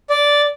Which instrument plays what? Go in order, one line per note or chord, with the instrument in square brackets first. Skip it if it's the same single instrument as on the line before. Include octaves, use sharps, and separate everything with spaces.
[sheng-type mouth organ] D5